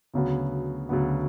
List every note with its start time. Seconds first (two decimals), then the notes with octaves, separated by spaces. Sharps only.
0.14 D2 C#3 F#3 B3
0.89 D2 C#3 F#3 B3